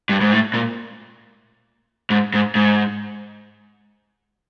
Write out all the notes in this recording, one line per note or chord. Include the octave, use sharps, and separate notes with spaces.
G2
G#2
A2
A#2
G#2
G#2
G#2